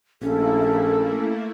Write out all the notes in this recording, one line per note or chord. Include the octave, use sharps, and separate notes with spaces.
A#1 A3 A#3 C#4 E4 A4